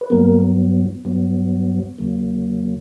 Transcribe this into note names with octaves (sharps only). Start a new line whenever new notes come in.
B4
G2 F#3 A#3 B3 A#4
G2 F#3 B3
E2 C#3 F#3 A#3